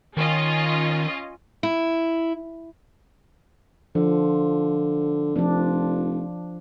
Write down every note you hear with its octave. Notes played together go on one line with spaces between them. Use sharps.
D#3 C#4 F4 D#5
E4
D3 F3
F1 F3 D4